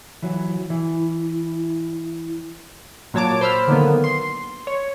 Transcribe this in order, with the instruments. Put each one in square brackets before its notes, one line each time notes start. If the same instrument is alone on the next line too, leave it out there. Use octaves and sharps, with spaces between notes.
[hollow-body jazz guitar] E3 F#3
[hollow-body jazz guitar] E3 [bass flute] E4
[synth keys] A#2 F#3 C#5 A5 D6
C5 B5 E6 F6
D3 D#3 F#3 A#3 B3
C6
C#5